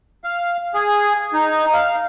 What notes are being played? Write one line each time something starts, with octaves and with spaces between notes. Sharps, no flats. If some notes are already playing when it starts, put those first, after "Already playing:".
F5
G#4
D#4
F5